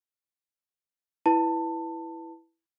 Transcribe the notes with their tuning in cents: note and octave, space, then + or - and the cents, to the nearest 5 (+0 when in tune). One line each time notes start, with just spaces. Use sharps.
E4 +0 B4 +0 A5 +20